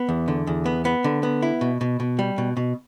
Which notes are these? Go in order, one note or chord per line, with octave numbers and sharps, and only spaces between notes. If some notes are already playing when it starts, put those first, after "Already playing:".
Already playing: B3
E2
D3
E2
B3
B3
D3
B3
E4
B2
B2
B2
G3
B2
B2